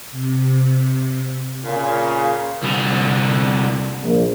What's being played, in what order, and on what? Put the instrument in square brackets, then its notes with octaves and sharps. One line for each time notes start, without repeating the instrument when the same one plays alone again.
[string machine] C3
[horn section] A#2 C#3
[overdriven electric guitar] C2 D3
[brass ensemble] A#1